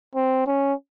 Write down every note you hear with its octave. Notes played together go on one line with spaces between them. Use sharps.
C4
C#4